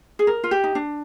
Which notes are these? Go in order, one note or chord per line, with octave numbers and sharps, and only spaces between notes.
G#4
A#4
F4
G4
D#4
D4